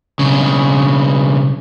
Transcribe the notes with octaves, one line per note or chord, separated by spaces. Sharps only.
B1 C#3